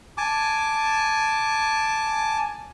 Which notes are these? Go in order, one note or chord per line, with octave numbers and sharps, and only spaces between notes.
G#5 A5 D6